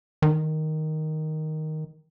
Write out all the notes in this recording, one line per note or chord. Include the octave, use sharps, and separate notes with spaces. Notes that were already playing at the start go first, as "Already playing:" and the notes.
D#3